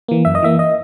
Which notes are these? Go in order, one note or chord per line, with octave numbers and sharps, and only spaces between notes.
E3 A#3
F#2 E5
D#5
E3 A#3 E5
D#5